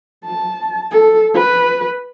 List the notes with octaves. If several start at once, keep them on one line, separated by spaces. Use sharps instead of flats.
A5
A4
B4